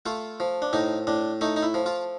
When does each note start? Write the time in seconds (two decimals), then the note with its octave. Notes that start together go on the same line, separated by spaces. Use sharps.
0.06 A3 F4
0.40 F3
0.62 D4
0.73 A2 D#4
1.07 A2 D4
1.41 A3 D#4
1.56 D#4
1.63 E4
1.74 F3
1.86 F4